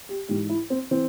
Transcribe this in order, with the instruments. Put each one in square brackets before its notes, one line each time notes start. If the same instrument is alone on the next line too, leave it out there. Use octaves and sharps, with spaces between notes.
[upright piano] G4
G#2 E3 G4
E4
C4
E3 C4